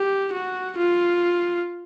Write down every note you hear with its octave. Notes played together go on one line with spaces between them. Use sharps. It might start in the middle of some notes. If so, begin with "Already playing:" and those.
Already playing: G4
F#4
F4